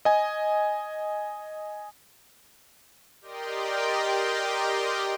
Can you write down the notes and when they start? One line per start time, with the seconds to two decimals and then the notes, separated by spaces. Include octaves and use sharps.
0.05 D#5 G#5
3.21 G4 A#4 D5 D#5 G5 C6